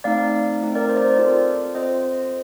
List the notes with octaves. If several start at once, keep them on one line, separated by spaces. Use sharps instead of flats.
A3 C4 D#4 D5 F5
A3 C4 D#4
A#4 D5
C5
D5
C5
C4 F4 A4 A#4 D5
C4 F4 A4 C5 D#5